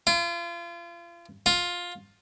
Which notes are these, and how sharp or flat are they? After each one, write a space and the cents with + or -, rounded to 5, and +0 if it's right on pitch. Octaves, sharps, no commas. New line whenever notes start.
F4 -35
F4 +10